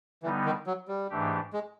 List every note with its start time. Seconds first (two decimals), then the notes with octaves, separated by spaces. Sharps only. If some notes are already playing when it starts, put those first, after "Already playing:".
0.23 D3 E3 G3 B3 D#4
0.45 D#3
0.67 F#3
0.88 G3
1.10 G#2 E3 A3 D4 G4
1.53 G#3